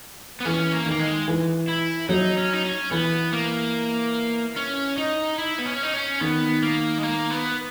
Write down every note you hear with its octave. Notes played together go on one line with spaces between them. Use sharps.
B3
E3 C#4
A#3
D#3
A#3
G#3
E3
E4
F#3 D#4
C#4
D#4
C#4
E3 B3
A#3
C#4
D#4
E4
B3
C#4
D#4
C#4
D#3 B3
A#3
G#3
A#3
B3